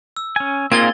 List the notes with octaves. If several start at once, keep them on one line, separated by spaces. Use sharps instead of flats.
E6
C#4 G#5
A#3 C4 D#4 F4 G#4 G#6 A6 G7